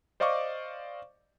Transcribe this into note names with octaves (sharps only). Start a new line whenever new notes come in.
C5 D5 D#5 F5 C#6 D6